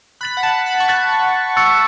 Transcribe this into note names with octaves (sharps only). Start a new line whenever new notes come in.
B5 F#6 A6 F#7
F#5
A5
B5
C#6
B5 F#6 A6 F#7
C#6 E6 A6 C#7